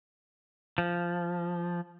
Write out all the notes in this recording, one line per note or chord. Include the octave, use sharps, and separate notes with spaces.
F3